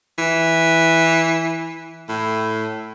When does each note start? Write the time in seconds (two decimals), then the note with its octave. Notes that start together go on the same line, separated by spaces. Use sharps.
0.18 E3
2.09 A2